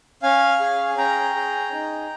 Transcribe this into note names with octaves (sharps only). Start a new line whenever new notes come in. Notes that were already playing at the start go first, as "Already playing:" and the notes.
C#4 F5 G#5
G#4
C#4 G5 A#5
G#4
D#4